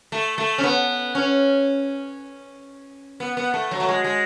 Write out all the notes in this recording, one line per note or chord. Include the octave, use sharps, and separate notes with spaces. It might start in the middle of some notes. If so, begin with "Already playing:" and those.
A3
A3
C#4
B3
C#4
B3
B3
A3
F#3
A3
G#3
G#3